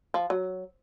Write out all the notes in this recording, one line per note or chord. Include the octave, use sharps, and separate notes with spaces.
F3
F#3